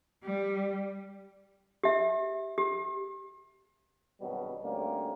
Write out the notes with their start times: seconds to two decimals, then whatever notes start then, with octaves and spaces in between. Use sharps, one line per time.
0.24 G3
1.84 G4 E5
2.58 G4
4.20 G#1 G2 B2 F#3 G3
4.62 D2 G3 A#3 C4 C#4